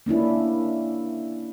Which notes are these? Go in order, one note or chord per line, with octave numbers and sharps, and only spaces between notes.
A#3 C#4 D4 E4